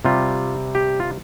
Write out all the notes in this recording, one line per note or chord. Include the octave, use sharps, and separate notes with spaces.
C3 G3 F4
G4
F4